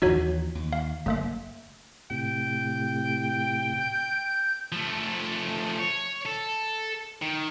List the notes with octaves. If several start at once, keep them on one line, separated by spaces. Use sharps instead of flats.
D#2 E3 F3 D#4 F#4 C#5
D#2
F5
F#1 A3 A#3 E5
A2 C3 G5
G6
F3 A3
C#5
A4
D#3